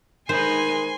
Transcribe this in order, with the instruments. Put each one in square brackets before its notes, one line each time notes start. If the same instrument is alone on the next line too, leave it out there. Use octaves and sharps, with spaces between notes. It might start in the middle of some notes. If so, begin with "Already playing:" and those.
[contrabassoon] D#3 [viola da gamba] G#3 D#4 B4 [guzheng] C5 [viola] G#5 C6